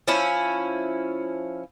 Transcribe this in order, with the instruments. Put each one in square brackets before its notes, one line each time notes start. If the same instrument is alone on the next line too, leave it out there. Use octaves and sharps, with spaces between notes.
[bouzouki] F3 C#4 E4